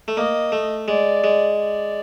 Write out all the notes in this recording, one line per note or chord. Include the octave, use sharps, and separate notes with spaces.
A3
A#3 D#5
A3
G#3 D5
G#3
D5